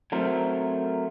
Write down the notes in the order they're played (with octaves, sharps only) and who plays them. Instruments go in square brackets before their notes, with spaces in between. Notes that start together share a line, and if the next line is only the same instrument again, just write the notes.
[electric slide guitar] F#3 A3 C4 A#4 C5